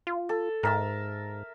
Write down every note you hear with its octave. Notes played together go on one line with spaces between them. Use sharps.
F4
A4
G#2 A#4 E5 A5